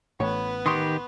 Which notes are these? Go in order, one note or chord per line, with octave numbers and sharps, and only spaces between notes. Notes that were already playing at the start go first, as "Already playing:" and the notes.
A1 B3 B4 C#5
D#3 G4 C6 C#6 D#6